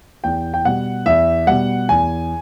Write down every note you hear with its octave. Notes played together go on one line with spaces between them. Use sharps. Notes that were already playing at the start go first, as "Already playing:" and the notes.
E2 G5
G5
B2 G3 F#5
E2 E5
B2 G3 F#5
E2 G#5